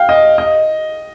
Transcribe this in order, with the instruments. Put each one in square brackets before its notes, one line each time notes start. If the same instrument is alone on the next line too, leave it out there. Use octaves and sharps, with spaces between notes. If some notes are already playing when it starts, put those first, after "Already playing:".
Already playing: [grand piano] F5 G5
D#5
D#5